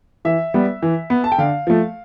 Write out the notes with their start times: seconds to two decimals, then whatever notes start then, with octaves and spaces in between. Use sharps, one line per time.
0.25 E3 E5
0.54 G3 B3
0.83 E3
1.10 B3
1.24 A5
1.32 G5
1.38 D3 F5
1.67 F3 A3